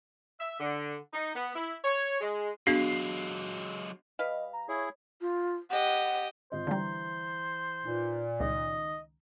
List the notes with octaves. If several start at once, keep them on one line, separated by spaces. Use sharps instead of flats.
E5
D3
D#4
B3
E4
C#5
G#3
F#3 G#3 B3 D4 F#4 G#4 F5 C7
G3 B4 D#5 F5
A#5
E4 G#4 C#5
F4
G4 D#5 F#5
G#1 F4 C5 D#5
D3 E3 G3 A#5 C6
A#2 D#4 B4
C#2 D#3 D#5